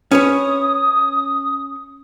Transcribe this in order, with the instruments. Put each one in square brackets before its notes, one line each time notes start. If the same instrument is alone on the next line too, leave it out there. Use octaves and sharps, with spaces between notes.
[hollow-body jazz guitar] C#4 B4 C#5 [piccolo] D#6